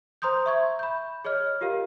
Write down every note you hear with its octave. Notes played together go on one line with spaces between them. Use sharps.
C5 A#5 C6 D#6 G6
E5 C#6 G#6
B5 G6
G#4 C#5 D#5 F6
F4 G4 A#4 F5